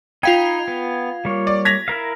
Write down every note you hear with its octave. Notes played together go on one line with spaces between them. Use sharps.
D#4 F4 F5 G5 B5 G#6
B3
G3 A#3 C#5
D5
G#6 A#6 B6 F7
E4 A#4 F5